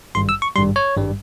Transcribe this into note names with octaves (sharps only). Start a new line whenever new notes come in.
G#1 G2 G3 C6
E6
C#6
G#1 G2 G3 C6
C#5
G#1 G2 G3